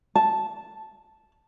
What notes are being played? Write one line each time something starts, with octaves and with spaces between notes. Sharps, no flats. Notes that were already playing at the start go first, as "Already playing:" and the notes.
A5